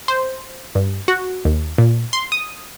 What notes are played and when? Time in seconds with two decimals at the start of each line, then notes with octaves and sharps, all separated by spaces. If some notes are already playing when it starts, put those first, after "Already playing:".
0.08 C5
0.75 G2
1.08 F#4
1.45 D#2
1.78 A#2
2.13 C6
2.32 D#6